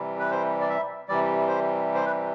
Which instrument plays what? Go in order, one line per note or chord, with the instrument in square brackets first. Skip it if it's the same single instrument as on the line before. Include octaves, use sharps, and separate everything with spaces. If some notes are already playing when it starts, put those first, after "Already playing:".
Already playing: [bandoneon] C3 E3 G3
B4
C5
D5
E5
C3 E3 G3 D5
C5
C5
B4